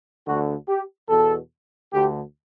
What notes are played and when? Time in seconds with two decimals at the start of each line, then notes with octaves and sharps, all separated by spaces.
0.26 D2 D3 F#4
0.68 G4
1.09 E2 B2 A4
1.93 D2 D3 G4